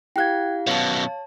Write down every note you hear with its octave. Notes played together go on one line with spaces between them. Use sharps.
E4 G4 F5 G5 F#6 G#6
F#2 B2 C#5 F5 A5